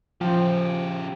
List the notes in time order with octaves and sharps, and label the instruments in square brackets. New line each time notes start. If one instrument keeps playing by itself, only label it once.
[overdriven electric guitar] C#3 G4 [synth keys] F3